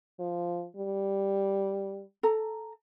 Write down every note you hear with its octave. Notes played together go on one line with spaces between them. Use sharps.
F3
G3
A4 A#5